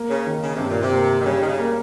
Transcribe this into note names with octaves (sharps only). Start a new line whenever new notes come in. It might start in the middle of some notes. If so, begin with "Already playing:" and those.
Already playing: A#3
C#3
D#3
C#3
G2 C3
A#2
C3
A#3
D#3
C#3 G3
D#3
C#3
A#3